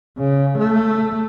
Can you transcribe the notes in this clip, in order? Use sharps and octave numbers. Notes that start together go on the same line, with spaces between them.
C#3
A3